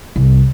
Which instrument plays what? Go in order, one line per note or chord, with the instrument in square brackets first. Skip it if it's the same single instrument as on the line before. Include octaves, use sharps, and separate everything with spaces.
[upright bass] C2